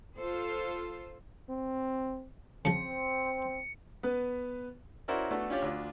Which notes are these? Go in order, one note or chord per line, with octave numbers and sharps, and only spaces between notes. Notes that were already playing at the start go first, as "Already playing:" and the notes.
F4 A4 C5
C4
C#3 F3 C4 C#7
B3 B4
C#4 E4 F#4 A#4 C5 D5
A3 B3 D4 F#4 A4
C#4 D4 F4 G4 C#5 D5
D2 D4 F4